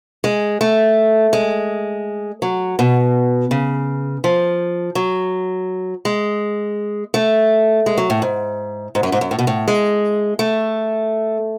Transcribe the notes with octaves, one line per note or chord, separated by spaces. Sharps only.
G#3
A3
G#3
F#3
B2
C#3
F3
F#3
G#3
A3
G#3
F#3
A2
G#2
G#2
F#2
G#2
F#2
A2
B2
A2
G#3
A3